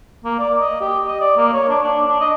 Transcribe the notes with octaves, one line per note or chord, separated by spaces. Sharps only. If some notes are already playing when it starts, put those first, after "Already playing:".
A#3
D5
D#5
G4
D#5
D5
A#3
C#5
D4
D4
D4
D#5